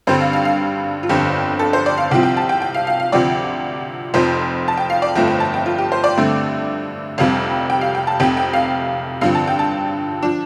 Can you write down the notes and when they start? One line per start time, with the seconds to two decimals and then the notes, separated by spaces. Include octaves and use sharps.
0.07 G2 D3 G3 C4 C5
0.21 F5
0.33 F5
0.45 F5
1.03 F4
1.09 G1 F2 D3 G4
1.59 A4
1.73 C5
1.86 D5
1.98 F5
2.11 C2 C3 F3 C4 G5
2.23 G5
2.37 A5
2.49 G5
2.62 G5
2.74 F5
2.87 F5
3.00 F5
3.12 D2 C3 F3 C4 D5
4.14 F1 F2 F3 C5
4.68 A5
4.77 G5
4.90 F5
5.02 D5
5.15 G1 F2 F3 A3 G5
5.27 G5
5.40 A5
5.54 G5
5.66 F4
5.78 G4
5.92 C5
6.04 D5
6.17 G2 D3 A3 C4
7.18 F1 F2 C3 G3 F5
7.70 G5
7.81 F5
7.95 G5
8.07 A5
8.20 F1 F2 C3 G5
8.37 G5
8.53 F5
9.21 G2 D3 F3 C4 F5
9.35 A5
9.47 G5
9.59 A5
10.23 F3 D4